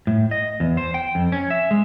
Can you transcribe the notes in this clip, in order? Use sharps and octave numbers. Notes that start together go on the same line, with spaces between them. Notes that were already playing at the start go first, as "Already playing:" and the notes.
A2
D#5
E2
C5
G5
F2
C#4
E5
G#3